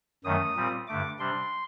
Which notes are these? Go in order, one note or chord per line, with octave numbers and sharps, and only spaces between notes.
F#2 D#3 F#3 A3 D#6
A#2 G3 C4
G2 D3 A3 D6
C3 G3 D4 C6